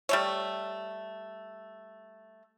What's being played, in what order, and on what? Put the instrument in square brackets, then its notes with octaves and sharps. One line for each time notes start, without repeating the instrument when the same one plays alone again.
[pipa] G3 A3 C#5